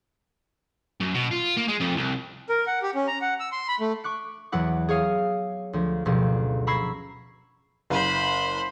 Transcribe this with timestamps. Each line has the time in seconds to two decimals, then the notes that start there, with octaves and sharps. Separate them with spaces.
1.01 F#2
1.15 B2
1.31 F4
1.57 A#3
1.68 G#3
1.81 F2
1.97 C2
2.49 A#4
2.67 F#5
2.82 G4
2.95 C#4
3.08 A#5
3.21 F#5
3.40 E6
3.52 C6
3.68 B5
3.80 A3
4.04 C#6 D6 F#6 C#7
4.52 E2 E3 F#3 E4 F#5 D6
4.88 G#4 C#5 F5 D#6
5.73 D2 F3
6.05 F#1 D2 B2 F3 G4
6.67 A#5 B5 C#6 E6 G#6 C7
7.90 F#1 C5 B5